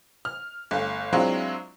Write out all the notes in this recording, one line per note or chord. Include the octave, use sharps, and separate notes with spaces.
F6
G1 A3 F5
F#3 G#3 C4 D4 E4 F4